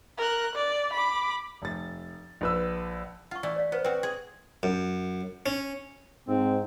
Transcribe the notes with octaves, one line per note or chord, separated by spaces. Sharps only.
A#4 F#6
D5
B5 D6
F1 A6
A#1 B4 E6
F4 F#5 C#6
E3 A3 D5
C#5 D5 F5
B3 B4 C5
C4 F#4 B4 G5 D#6
G#4 C6
F#2
C#4
G#2 C4